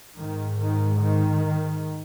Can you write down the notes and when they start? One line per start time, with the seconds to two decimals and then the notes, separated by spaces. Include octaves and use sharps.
0.17 G#2 D#3
0.58 D#3
0.99 D#3